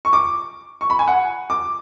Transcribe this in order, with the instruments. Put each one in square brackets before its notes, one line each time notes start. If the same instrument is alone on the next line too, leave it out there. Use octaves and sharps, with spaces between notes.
[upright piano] C#6
D6
C#6
B5
G#5
F#5
D6